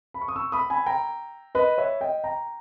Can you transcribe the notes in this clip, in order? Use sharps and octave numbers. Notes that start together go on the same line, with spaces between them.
B5
C#6
D#6
C#6 E6
B5 D#6
G#5 B5
G5 A#5
B4 D#5
C#5 E5
D#5 G5
G5 A#5